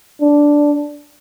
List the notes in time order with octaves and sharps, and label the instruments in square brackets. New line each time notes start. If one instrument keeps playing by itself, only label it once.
[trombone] D4